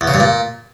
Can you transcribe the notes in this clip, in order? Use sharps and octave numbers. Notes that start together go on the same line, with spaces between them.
E2
C#3
G2
A#2